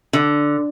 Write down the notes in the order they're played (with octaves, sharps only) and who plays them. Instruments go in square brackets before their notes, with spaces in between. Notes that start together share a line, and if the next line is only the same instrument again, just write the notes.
[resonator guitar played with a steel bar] D3